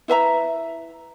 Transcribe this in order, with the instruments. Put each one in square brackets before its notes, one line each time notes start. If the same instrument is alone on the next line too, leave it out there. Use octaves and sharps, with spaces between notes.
[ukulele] E4 B4 E5 A#5